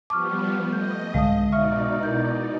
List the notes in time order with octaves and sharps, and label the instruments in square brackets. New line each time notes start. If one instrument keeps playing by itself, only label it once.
[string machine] F3 G3 B3 [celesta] A5 C#6 F6 [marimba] D6
[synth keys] A3 [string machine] D#5 [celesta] G6
[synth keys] C2 G#2 D3 [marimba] G#3 [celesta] F5 A5 D#6
[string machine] B2 D#4 D5 [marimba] E5 [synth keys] C#6 [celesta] F6
[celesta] E4 A#4 G6